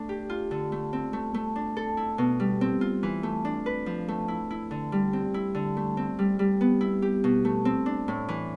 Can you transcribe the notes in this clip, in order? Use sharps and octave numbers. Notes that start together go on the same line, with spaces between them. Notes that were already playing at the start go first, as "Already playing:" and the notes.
Already playing: A3 D4
G4
F4
D3
A3
C4
A3
A3
D4
A4
E4
B2
G3
C4
F4
E3
A3
D4
B4
F3
A3
E4
E4
D3
G3
C4
E4
D3
A3
C4
G3
G3
B3
E4
G4
B2
A3
C4
D4
A2
E3